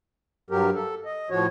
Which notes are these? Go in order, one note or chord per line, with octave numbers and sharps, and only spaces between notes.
G2 F#3 G4 A#4
A4
D#5
A2 F3 F#4 C#5